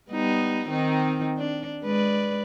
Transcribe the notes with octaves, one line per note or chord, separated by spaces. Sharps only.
G3 B3 D#4
D#3 C4 D#4
D4
G#3 B4 D5